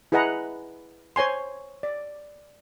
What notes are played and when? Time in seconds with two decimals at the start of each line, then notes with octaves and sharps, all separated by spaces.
0.12 E4 G#4 B4 D#5 F#5 A#5
1.16 C5 C#5 G#5 C6
1.83 D5